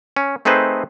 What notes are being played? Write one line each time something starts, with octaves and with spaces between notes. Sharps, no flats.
C#4
A3 C4 D#4 G#4 B4 C5